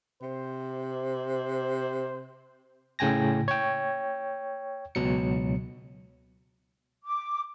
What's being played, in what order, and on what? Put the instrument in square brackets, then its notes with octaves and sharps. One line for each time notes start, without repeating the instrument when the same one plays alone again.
[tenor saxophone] C3 [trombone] C5
[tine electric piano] A2 C#3 G5 G#5 A#6
C#5 G5
C#2 B2 F#3 C#7
[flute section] D6